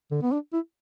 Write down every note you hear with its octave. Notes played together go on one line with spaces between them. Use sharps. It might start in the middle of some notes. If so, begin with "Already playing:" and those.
D3
B3
D4
E4